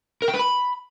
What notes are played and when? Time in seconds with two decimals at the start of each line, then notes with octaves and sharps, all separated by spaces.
0.22 A#4
0.28 G5
0.34 B4
0.39 B5